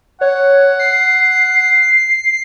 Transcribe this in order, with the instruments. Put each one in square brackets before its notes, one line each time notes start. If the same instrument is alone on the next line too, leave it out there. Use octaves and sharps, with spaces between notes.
[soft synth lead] C#5 [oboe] F#5
[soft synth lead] C7